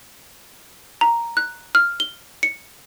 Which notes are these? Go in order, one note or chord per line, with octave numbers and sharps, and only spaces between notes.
A#5
F#6
F6
G7
C#7